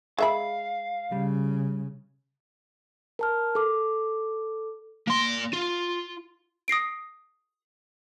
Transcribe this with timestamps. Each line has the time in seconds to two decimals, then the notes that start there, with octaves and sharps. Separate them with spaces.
0.19 G#3 E5 F5 B5
1.12 C#3 G3
3.19 A#4 A5 F6
3.55 A4 D6
5.08 A#3 C6
5.54 F4
6.68 D#6 A#6 C7 D7